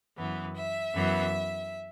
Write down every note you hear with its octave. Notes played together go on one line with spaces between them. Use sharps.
F#2 E3 B3
E5
F#2 E3 B3